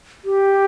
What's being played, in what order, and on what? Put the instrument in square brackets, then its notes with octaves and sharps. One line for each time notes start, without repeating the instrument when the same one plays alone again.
[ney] G4